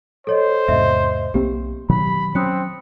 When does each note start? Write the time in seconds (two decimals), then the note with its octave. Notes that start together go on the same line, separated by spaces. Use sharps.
0.27 A4 C5 C#5 D#5
0.68 E2 G#2 C3 D#5 E5
1.34 B1 A#3 C4 G4
1.89 B2 D#3 F#3 B5
2.35 F#3 C4 C#4 D#6 F#6 C#7